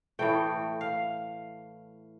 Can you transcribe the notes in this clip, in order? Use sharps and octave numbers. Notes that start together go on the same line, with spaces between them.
A2 E3 A3 G5
F5